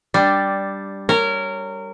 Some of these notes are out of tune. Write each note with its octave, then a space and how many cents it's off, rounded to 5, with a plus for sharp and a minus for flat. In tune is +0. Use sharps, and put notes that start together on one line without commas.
G3 +0 D4 -5
A#4 -20 C#5 +0